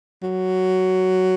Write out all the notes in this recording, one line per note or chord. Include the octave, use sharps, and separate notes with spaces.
F#3